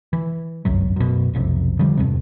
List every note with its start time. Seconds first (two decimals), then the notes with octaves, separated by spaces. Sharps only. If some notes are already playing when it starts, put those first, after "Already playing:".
0.13 E3
0.65 G1 C2 F#2 F#3
0.96 F#2 B2
1.33 F1 B1 F2 C3
1.79 D3 F3 G3
1.97 E2 G2 C3